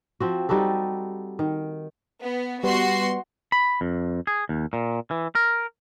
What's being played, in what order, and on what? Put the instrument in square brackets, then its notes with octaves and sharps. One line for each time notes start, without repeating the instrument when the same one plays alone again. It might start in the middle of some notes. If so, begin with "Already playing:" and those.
[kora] F3 C4 F#4
G3 D#4 F#4 A4
D#3
[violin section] B3
[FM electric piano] G3 B3 [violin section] F#4 C6
[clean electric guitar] B5
F2
G#4
D#2
A#2
E3
A#4